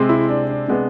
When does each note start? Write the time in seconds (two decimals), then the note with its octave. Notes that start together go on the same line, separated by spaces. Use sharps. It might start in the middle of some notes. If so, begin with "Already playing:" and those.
Already playing: C3 G#3 C4
0.09 E4
0.29 D4
0.48 D4
0.68 C3 G#3 B3